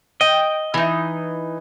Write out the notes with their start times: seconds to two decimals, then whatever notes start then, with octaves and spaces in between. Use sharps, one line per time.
0.21 D#5 G5
0.74 E3 D#4